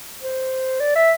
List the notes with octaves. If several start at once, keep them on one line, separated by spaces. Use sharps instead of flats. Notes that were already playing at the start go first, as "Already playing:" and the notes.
C5
D5
E5